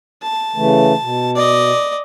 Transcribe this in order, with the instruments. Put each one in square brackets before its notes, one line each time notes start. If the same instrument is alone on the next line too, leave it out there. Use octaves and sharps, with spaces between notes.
[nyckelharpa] A5
[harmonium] C#3 E3 A3
B2
[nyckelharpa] D5 D#5